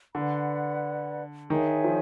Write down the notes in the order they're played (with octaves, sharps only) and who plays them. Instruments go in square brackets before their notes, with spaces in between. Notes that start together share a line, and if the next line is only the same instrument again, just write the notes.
[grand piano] D3 [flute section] B4 D5 F#5 B5
[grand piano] D#3 [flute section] G#4 C#5 E5 G#5
[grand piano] F3